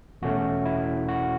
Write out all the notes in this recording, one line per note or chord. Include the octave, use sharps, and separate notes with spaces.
E2 B2 A3 C#4 F#4
E4
F#4